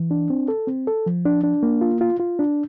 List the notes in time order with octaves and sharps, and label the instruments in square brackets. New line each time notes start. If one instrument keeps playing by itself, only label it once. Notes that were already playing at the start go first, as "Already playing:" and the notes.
Already playing: [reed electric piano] E3
D4
C4
A4
C4
A4
F3
D4
D4
A#3
F4
F4
F4
D4